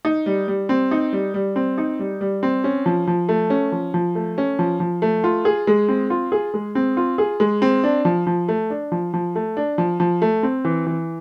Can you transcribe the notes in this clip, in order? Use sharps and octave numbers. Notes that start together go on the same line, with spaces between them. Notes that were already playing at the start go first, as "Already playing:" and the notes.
D#4
G3
G3
C4
D#4
G3
G3
C4
D#4
G3
G3
C4
C#4
F3
F3
A3
C#4
F3
F3
A3
C#4
F3
F3
A3
F4
G#4
G#3
C4
F4
G#4
G#3
C4
F4
G#4
G#3
C4
D4
F3
F3
A3
D4
F3
F3
A3
D4
F3
F3
A3
C4
E3
E3